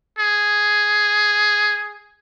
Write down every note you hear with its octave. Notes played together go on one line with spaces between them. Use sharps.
G#4